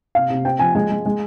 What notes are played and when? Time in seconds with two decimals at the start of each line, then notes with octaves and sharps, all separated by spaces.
0.15 C3 F5
0.30 C3
0.45 C4 G5
0.59 F3 G#5
0.75 G#3 G#5
0.90 G#3
1.06 G#3